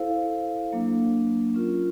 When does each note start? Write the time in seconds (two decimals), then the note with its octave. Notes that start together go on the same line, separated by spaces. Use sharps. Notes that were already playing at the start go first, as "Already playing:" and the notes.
Already playing: E4 A4 C5 F5
0.72 F#3 A#3 D4
1.54 C#4 F4 A#4